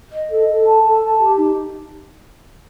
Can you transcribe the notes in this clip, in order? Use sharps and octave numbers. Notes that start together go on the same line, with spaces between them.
D#5
A4
A4
A5
A4
A5
G4
D#4